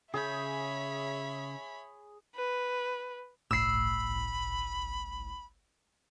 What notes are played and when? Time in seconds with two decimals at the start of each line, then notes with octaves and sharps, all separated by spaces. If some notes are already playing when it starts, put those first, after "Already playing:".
0.14 C#3 G#4 C#5 E5 B5 G6
2.35 B4
3.51 G1 C2 A2 B5 E6 C7